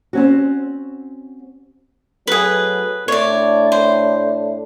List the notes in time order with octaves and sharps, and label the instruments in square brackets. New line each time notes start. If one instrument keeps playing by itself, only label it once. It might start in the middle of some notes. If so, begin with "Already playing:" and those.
[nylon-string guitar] C4 C#4 F#4
[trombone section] F#3 A3 B3 [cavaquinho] G#4 B4
[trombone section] A2 D4 [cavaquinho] C#5 D5
[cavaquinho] C5